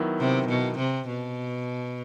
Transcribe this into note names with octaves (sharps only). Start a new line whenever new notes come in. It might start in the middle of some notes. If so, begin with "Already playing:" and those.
Already playing: D#3 F#3 B3 E4
C3
B2
C3
B2